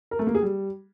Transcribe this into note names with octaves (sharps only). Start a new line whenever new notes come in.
A#4
A3
A#3
G#4
G3